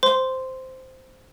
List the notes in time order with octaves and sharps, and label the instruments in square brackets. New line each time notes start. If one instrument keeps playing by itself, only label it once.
[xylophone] C5 C6